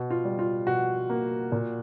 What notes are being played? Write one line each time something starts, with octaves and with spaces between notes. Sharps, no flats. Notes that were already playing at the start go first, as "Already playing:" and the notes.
Already playing: B2
F4
G3
F4
B2 F#4
A#3
A#2